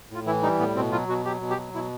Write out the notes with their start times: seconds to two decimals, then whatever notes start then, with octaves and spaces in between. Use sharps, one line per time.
0.10 A2 F4
0.26 E3 E4
0.43 G3 D#4
0.59 A2 B3
0.76 B2 C4
0.92 F#3 F4
1.08 B2 F#4
1.25 F#3 G4
1.41 B2
1.50 G4
1.57 F#3
1.74 B2 E4